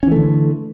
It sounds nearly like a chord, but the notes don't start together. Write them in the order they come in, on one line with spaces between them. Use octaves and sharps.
C#4 E3 A3 D3